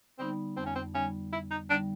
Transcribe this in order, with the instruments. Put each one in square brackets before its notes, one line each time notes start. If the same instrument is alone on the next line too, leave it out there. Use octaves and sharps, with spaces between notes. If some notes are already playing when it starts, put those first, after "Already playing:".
[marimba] D3 G3 B3 D#4 [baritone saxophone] C4
[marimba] F2 [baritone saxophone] C4
[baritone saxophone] C#4
C4
[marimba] D3 G3 B3 D#4 [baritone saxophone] C#4
[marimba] F2 [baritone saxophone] E4
[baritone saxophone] D#4
[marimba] D3 G3 B3 D#4 [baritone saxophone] D4